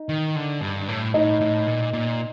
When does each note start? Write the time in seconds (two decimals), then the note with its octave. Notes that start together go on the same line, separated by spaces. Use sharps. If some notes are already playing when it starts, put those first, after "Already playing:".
Already playing: D#4
0.09 D#3
0.36 D3
0.61 G2
0.89 A2
1.14 A2 D#4
1.41 A2
1.67 A#2
1.93 A#2